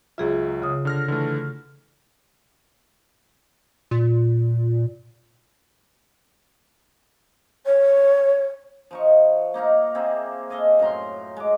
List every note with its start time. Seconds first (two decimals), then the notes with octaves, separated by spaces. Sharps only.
0.18 C#2 F#3 F4 G#4 E5
0.62 C#3 D#6
0.85 D3 F6 A#6
1.08 D3 E3 A3
3.91 A#2
7.66 C#5
8.91 F3 D#4 C#6
9.54 A#3 D#4 F5 A#5
9.95 A#3 C4 G#4 E5
10.50 A4 D#5 F5 G#5
10.79 F#2 A2 A#5 C6
11.37 G#3 D6